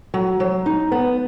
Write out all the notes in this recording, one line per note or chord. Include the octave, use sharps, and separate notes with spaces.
F#3
F#3
D#4
B3